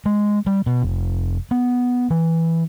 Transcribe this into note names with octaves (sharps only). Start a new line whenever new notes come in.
G#3
G3
B2
F1
B3
E3